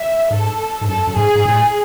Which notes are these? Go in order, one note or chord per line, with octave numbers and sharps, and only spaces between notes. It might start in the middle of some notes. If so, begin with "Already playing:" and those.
Already playing: E5
G#2 A4
G#2
F#2 A4
F#2
G#2 G#4
G#2
A2